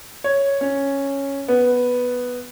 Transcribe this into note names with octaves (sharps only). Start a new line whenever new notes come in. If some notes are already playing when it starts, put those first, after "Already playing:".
C#5
C#4
B3